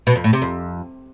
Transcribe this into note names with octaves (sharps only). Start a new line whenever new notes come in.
B2
F2
A2
C3
F2